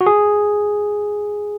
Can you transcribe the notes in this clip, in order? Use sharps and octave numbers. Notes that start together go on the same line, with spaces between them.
F#4
G#4